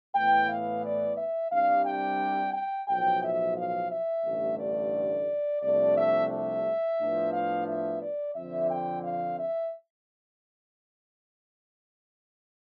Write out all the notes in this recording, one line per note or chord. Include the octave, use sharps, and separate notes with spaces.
A2 E3 B3 G5
F5
D5
E5
C2 C3 G3 D4 F5
G5
G5
B1 A2 F3 G5
E5
F5
E5
A1 G2 D3 A3
D5
C2 C3 F3 A3 D4 D5
E5
E5
A2 F3 B3 D4
F5
E5
D5
F2 D3 F3 C4 E5
G5
F5
E5